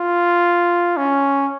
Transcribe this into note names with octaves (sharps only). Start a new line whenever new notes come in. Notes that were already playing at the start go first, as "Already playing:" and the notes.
Already playing: F4
C#4